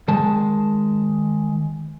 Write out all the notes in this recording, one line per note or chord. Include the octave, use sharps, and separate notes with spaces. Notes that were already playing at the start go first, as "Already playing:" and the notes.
D#3 G#3 A5